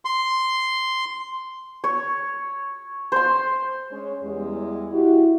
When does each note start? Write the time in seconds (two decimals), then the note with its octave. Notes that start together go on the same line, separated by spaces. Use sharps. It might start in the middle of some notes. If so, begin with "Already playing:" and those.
0.05 C6
1.84 C#5
3.12 C5 C6
3.91 G#3 C#4 C#5
4.23 E2 G3 G#3
4.93 E4 F#4 G4